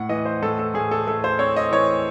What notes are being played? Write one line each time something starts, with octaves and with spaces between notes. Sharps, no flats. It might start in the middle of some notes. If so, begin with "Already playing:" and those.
Already playing: A2 F#5
E3 D#5
C5
A2 A4
A4
A2 G#4
A4
A3 A4
C5
C4 C#5
D#5
E3 C#5